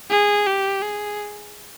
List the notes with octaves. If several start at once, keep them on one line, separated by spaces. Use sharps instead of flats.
G#4
G4
G#4